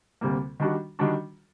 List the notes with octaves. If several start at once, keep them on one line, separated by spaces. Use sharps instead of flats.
D2 C3 G3 A#3
D#3 G3 D4 F#4
D#3 G3 D4 F#4